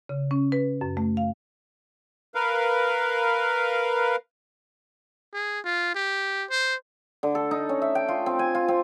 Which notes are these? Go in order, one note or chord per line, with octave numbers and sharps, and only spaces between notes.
C#3
C#4
B4
F#2
A3
F5
A#4 B4 F5
G#4
F4
G4
C5
D3
A4
D#4
C#4
E5
G5
F4
C4
G#5
F4
C4